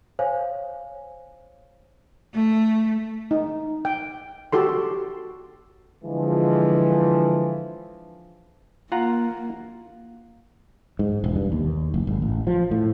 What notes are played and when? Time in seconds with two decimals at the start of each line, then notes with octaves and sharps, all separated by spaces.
0.19 C5 C#5 F5 G#5
2.34 A3
3.31 D#4
3.85 G5
4.53 F#4 G4 A4 C6
6.04 D3 E3 F3 G#3
8.92 A#3 F4 F#5 A#5
10.99 G#2
11.24 E1
11.36 G2
11.52 D#2
11.94 F#1
12.07 G#1
12.22 A1
12.47 F3
12.71 A2